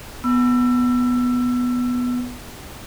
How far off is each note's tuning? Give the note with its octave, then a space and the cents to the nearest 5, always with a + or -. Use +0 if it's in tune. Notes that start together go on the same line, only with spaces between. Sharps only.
B3 +0 E6 +25